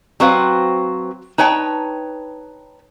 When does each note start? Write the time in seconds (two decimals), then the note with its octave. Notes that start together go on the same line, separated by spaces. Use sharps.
0.20 F#3 C4 F#4 B4 C5 F5
1.38 D#4 B4 C#5 G5 A5